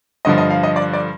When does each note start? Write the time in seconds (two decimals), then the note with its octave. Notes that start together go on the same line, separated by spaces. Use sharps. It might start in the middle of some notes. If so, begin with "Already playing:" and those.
0.25 G2 D3 F3 D#5
0.38 D#5
0.50 F5
0.63 D#5
0.76 D5
0.93 D5